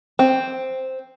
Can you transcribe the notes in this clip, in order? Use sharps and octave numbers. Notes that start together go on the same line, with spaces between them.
C4